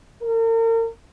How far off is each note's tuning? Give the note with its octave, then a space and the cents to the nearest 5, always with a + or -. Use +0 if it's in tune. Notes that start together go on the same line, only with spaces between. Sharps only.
A#4 -40